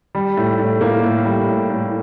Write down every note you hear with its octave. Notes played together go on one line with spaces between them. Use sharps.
G3
A2
A2
A#3
A2
G3
A2
A2